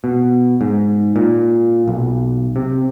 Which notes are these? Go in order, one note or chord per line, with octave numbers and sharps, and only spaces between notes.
B2
G#2
A#2
B1
C3